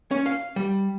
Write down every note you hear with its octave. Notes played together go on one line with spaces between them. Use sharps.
C#4
F5
G3